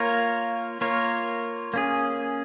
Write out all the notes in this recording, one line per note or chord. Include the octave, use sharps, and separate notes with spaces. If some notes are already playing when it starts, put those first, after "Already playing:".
Already playing: A#3 F4 A#4 C#5
A#3 F4 A#4 C#5
A#3 C#4 G#4